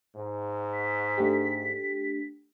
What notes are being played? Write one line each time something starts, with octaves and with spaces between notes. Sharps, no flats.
G#2
B6
A3 D4 G4